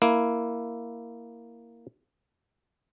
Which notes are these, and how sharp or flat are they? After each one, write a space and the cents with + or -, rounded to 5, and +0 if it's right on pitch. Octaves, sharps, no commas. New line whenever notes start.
A#3 +0 E4 +0